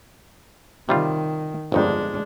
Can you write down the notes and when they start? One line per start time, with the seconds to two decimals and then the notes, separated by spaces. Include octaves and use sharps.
0.89 C3 D#3 G3 F4
1.72 G1 F2 G#3 D4 D#4